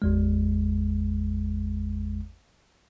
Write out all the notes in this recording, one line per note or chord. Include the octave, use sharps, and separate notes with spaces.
G#1 E2 G#3